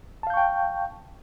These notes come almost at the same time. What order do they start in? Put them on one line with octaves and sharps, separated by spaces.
A5 F5 G6 C#6 G5